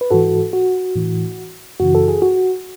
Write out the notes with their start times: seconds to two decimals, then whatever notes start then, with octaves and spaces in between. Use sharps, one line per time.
0.01 B4
0.11 G#2 E3 F#4 A4
0.53 F#4
0.96 A2 E3
1.80 F#2 C#3 E3 F#4
1.95 A4
2.08 G#4
2.22 F#4